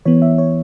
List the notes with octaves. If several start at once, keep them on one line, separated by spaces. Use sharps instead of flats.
E3 B3 C#5
E5
C#5